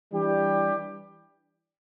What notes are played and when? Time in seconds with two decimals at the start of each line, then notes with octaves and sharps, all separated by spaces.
0.12 E3 G3 D4 G4